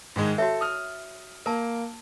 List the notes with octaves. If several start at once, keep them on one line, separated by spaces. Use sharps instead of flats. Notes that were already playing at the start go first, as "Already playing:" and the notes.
G#2 D#3 G#3
F#4 A4 C#5 E5
D#6 F6
A#3 A#4 A5